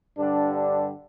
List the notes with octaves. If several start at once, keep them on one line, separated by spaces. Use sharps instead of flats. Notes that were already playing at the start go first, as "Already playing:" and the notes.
G2 D3 G3 D4
D4